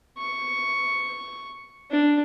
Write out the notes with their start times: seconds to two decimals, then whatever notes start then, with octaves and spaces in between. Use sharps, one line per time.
0.18 C#6
1.90 D4